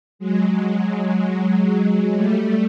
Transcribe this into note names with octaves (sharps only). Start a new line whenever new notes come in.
F#3 G#3
G3 A3